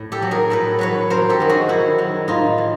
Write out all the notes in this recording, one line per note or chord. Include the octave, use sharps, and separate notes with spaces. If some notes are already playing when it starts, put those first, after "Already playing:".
Already playing: A2
G4 A4
F#3
G#4 A#4
A2 A4 B4
F#3 B4 C#5
F#2 A#4 C5
G4 A4
D#3 F#3
F#4 G#4
F#2 E4 F#4
D#3 F#3
A2 D#4 F4
E3